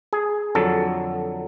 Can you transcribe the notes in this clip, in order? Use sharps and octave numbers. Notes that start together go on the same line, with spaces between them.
G#4
F2 D3 F#3 A4